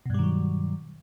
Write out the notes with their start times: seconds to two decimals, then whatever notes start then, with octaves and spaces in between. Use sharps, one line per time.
0.06 B2
0.10 G2
0.14 G3
0.19 D#3
0.23 F#3